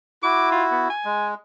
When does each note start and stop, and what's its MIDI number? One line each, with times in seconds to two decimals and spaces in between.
0.23 0.88 64
0.23 0.88 66
0.23 0.47 86
0.52 0.64 65
0.71 0.89 59
0.90 1.29 80
1.05 1.34 56